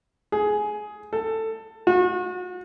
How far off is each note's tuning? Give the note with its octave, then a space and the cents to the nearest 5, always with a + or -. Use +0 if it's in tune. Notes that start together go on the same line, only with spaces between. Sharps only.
G#4 +15
A4 +15
F#4 -35